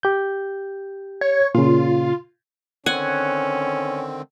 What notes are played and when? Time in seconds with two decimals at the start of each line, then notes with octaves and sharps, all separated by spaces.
0.03 G4 G6
1.21 C#5
1.55 A#2 C#3 F4
2.86 D3 D#3 C4 C#4 F#5 G#5